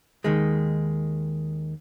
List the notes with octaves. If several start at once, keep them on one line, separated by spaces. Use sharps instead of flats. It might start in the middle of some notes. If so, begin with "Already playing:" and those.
D#2 D#3 G#3